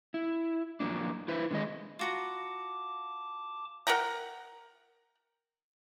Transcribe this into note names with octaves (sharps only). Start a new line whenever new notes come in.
E4
F#2 A#2 F3 A#3 D4
E4 B4 C5 E5
D3 D#3 G#3 G#4 D#5
F4 F#4 A5 A#5 D6
A#4 F#5 G5 A#5